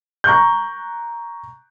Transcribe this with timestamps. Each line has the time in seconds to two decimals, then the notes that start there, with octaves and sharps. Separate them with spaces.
0.24 A#5 C#6 F#6 G6